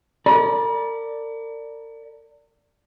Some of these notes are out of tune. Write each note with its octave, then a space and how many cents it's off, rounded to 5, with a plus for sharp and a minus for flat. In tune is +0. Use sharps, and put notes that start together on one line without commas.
A#4 -40 D5 +0 B5 -45